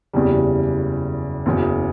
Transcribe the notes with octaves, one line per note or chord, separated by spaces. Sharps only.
F#1 E2 C#3 G3
F#1 E2 C#3